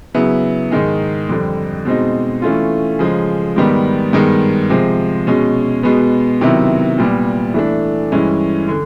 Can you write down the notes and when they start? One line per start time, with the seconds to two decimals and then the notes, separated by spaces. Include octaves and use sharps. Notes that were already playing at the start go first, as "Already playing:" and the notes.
0.14 C#3 F#3 B3 E4
0.71 G#2 D#3 G#3
1.29 F2 D3 G3
1.85 B2 G#3 C4 D#4
2.42 E3 A3 C#4 F4
2.99 C#3 F3 G#3
3.56 G#2 D#3 G3 B3
4.13 G2 D#3 G#3 B3
4.70 C3 F3 G#3
5.27 B2 G#3 C#4
5.83 B2 G#3 B3
6.41 C3 D#3 F#3 B3 E4
6.98 A#2 G3 B3
7.54 E3 A3 D4
8.12 G2 E3 G#3 C#4
8.68 D3